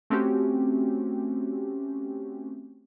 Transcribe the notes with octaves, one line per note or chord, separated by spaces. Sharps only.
A3 C4 C#4 F#4 G4